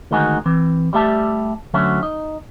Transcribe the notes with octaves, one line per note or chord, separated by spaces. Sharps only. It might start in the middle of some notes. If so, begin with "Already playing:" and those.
D2 D#3 G#3 D#4 F#4 G#5
E3 C4
G3 A3 G4 E5 A5
D2 D3 F#3 C#4 F#4 E5
D#4